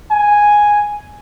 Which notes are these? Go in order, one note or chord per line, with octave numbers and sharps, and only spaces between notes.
G#5